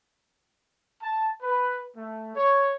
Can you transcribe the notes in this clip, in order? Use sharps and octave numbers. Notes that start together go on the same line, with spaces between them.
A5
B4
A3
C#5